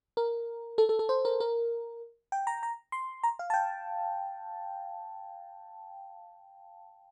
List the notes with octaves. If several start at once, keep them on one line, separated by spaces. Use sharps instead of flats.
A#4
A4
A4
A4
C5
A#4
A#4
G5
A#5
A#5
C6
A#5
F5
A5
G5